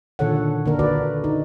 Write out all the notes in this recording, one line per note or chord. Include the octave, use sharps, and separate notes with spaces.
A#2 D3 D#3 A4 C#5 F#5
D3 A#3 D4 A#4
F#4 B4 D5
D#4